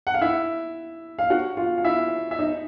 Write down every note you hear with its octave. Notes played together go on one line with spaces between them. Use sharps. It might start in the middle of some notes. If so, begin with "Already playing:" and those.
F#5
F5
E4 E5
F5
F#4 F#5
F4 F5
F5
E4 E5
E5
D#4 D#5